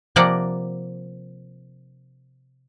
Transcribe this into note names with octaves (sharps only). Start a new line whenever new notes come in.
C3 F3 A#3 D5 F#5 A#5